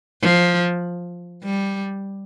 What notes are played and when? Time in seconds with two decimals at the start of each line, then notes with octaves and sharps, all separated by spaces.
0.21 F3
1.44 G3